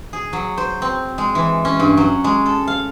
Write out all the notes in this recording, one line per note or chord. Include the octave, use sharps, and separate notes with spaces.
G#4
F#3
C5
C4
G#3
E3
C#4
G2
F#3
G#3
A4
F5